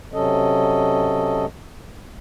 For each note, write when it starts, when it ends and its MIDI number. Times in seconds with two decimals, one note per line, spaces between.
0.13 1.46 48
0.13 1.46 54
0.13 1.46 61
0.13 1.46 69
0.13 1.46 75